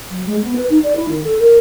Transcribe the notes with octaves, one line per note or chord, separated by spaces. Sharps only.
F#3
G#3
B3
B4
D#4
D5
E4
D#3
A4
A#4